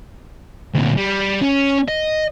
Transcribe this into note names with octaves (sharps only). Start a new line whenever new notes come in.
D2 A#2
G3
C#4
D#5